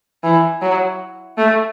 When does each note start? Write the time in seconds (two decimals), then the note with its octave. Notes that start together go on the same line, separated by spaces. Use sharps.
0.24 E3
0.62 F#3
1.38 A3